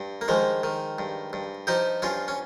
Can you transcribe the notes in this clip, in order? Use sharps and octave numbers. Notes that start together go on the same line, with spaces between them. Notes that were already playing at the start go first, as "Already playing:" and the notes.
Already playing: G2
A#3
D#3 F3 G#3
D#3
G2
G2
F3 D#4 G4
G2 C#4 F4
C#4